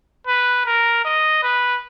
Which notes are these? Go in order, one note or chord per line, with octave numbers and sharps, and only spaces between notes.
B4
A#4
D#5
B4